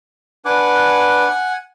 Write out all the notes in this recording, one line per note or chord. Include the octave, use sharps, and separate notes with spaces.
D4 B4 F#5 G#5 D6